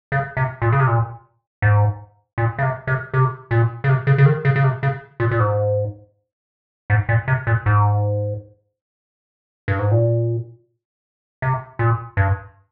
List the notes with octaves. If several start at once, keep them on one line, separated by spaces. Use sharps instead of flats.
C#3
C3
A#2
C#3
C3
A#2
G#2
A#2
C#3
C3
C3
C3
A#2
C#3
C3
C#3
C#3
D#3
C#3
C#3
C3
C#3
A#2
A#2
G#2
G#2
A#2
C3
A#2
G#2
G2
G#2
A#2
C3
A#2
G2